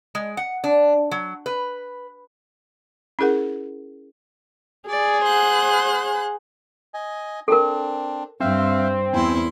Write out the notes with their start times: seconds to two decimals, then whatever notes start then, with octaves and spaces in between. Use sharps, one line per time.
0.15 G#3
0.37 F#5
0.64 D4
1.11 F#3
1.46 B4
3.19 C#4 E4 G#4 A#4 F#5
4.90 G#4 D5
5.25 C5 F#5 F#6
6.94 D#5 G#5
7.48 C4 D4 A4 A#4
8.40 G2 C4 E5 F5
9.13 E2 E4 G#5 C6